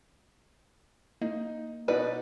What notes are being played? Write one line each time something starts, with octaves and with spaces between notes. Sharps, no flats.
A#3 D#4
B2 D#4 B4 D5